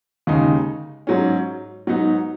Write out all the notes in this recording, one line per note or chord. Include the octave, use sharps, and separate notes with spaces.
D#2 C#3 G#3 D#4
G#2 F#3 C#4
G#2 F#3 B3 D#4